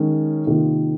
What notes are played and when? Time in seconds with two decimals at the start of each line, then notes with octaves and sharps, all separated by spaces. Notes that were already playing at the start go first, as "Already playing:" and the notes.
Already playing: D#3 G#3 C#4
0.46 C3 D#3 A#3 F4